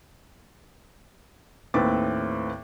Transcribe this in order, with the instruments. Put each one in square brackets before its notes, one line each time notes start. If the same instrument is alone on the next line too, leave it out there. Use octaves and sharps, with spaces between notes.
[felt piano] D#2 A2 C4 B4 D6 A6